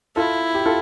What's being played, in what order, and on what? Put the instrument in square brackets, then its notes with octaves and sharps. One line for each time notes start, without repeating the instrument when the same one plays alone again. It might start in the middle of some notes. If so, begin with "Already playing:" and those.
[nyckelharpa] E4 [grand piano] F4 A4
[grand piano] G4
F4 A4